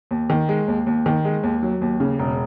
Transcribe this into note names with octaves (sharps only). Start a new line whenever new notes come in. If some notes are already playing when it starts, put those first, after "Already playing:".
D#2
D#3
G#3
D#2
D#2
D#3
G#3
D#2
F#3
D#2
C#3
E1